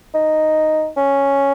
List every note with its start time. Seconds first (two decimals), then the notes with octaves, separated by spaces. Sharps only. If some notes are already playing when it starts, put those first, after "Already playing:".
0.14 D#4
0.97 C#4